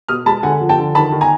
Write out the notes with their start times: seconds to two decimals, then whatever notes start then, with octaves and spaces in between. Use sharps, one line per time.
0.08 B2 D#6 F6
0.26 G#3 A5 B5
0.43 D3 F#5 G#5
0.61 F3
0.69 G5 A5
0.78 D3
0.94 D#3 A5 B5
1.12 D#3
1.21 G#5 A#5